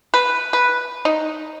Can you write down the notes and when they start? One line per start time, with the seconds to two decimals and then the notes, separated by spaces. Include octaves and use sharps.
0.14 B4
0.53 B4
1.05 D#4